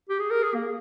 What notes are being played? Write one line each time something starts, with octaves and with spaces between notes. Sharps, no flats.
G4
G#4
A#4
G#4
A#3